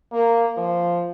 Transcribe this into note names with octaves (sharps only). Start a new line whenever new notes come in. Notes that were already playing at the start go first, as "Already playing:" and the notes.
A#3
F3